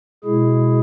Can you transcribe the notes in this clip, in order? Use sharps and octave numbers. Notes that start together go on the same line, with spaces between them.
B2 G#3 E4 G#4